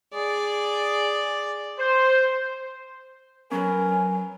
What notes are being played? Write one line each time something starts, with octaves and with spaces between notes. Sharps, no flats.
G#4 D5
C5
F#3 C#4 A#4 B4 G#5